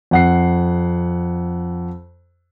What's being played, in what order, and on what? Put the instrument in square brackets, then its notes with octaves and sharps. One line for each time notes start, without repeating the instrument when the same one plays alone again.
[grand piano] F2 F#5 C7